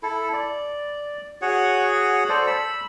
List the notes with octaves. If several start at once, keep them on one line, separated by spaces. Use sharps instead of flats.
E4 A4
D5
F#4 G#4 C#5 F#5
A4 C5 D5
B5 E6